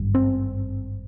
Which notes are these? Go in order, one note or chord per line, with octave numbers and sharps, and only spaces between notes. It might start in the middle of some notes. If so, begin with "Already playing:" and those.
Already playing: G#1 G2
C4